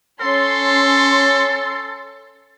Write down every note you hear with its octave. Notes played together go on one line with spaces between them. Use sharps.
C#4 A4 C6